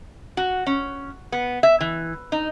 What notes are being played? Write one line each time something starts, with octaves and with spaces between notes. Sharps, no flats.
F#4
C#4
B3
E5
E3
D#4